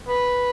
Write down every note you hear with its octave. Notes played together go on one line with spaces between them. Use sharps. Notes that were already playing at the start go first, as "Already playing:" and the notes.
B4